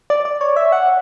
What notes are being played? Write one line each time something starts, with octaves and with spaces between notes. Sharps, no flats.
D5
D5
C#5
E5
F#5